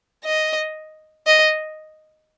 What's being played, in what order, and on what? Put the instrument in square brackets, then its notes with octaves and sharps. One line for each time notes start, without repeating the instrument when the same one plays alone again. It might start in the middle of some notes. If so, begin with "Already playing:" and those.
[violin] D#5
D#5